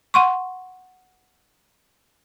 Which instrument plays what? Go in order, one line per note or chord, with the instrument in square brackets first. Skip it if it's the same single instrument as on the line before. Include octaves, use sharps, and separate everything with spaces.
[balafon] F#5 C6 C#6